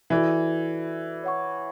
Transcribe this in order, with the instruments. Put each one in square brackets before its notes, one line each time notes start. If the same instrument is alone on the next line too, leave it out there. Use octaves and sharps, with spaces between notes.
[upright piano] E3 [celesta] F#4 A4 D5
[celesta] C#5 F#5 C#6